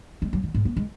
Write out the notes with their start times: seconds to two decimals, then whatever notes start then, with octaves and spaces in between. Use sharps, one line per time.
0.22 G#3
0.33 F#3
0.43 D#3
0.54 G#2
0.65 B3
0.77 G#3